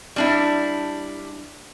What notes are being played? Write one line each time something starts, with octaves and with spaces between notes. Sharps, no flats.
G3 D4 E4